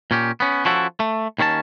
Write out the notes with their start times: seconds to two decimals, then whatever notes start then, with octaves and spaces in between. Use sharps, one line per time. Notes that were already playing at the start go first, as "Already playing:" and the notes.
0.11 A#2 C#4 G4
0.40 B3 C#4
0.65 F3 C#4 E4 F#4 A4
1.00 A3
1.38 D#2 D#3 C#4 C#5 A5